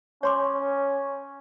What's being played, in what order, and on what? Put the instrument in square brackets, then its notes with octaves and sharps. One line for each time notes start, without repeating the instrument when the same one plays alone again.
[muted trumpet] C#4 [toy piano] C#5 C6 D6